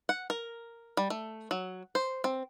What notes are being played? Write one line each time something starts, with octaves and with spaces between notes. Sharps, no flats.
F#5
A#4
G3
A3
F#3
C5
C4